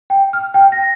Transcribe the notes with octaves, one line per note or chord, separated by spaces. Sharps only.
G5
F6
G5
A#6